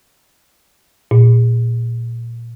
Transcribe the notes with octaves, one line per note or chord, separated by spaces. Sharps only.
A#2